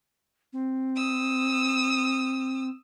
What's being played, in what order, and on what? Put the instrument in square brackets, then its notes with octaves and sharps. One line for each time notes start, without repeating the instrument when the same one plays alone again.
[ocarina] C4
[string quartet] D#6 E6